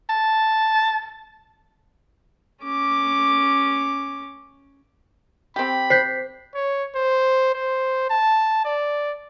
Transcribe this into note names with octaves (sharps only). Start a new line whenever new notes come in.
A5
C#4 D6
C4 G4 B5
C5 G6 B6 C7
C#5
C5
C5
A5
D5